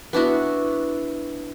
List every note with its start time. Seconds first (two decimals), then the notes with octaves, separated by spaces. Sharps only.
0.13 B3 D4 E4 F#4